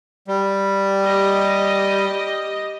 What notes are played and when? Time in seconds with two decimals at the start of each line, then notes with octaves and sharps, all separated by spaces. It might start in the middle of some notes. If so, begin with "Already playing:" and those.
0.28 G3
1.02 G4 D#5